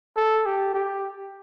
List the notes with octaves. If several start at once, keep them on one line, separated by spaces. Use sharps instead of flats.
A4
G4
G4